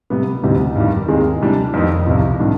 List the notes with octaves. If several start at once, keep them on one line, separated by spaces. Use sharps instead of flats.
C3 G3 B3
D2 C3 G3 C4 D#4
G2 D#3 G3
D#2 D#3 G#3 C4
C3 G3 D4
F2 D#3 B3 D#4
C2 C3 F3
C3 D#3 G3 D4